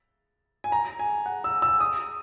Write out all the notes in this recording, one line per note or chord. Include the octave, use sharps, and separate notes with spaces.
G#5
A#5
G#5
F#5
E6
E6
D#6